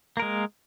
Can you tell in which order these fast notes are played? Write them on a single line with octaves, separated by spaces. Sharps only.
A#3 A#4 G#3